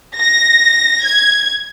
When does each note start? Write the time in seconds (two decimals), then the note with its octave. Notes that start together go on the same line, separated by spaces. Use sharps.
0.18 A#6
1.03 G#6